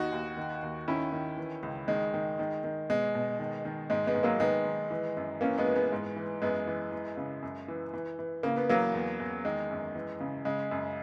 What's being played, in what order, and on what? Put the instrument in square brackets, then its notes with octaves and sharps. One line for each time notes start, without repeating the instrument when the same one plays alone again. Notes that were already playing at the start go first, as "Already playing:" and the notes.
Already playing: [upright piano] D#2 D#4 F#4
D#2
D#3
D#2
D#3 C#4 E4
D#3
E3
C#2
D#3 G#3
D#3
D#3
D#3
B2 G#3
B2
D#3
D#3
G#2 G#3
G#3 B3
G#2
F#3 A#3
D#3 G#3 B3
D#3
E3
F#2
E3 A#3 C#4
G#3 B3
E3
G#3 B3
G#2
E3
F#2 G#3 B3
E3
E3
C#3
F#2
E3
E3
E3
C#3 A#3
B3
E3 F#3 A#3
E2
E2
D#3 G#3
F#2
E3
C#3
C#3 G#3
F#2